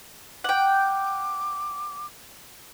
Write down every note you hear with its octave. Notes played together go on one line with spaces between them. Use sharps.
F#5 G5 D6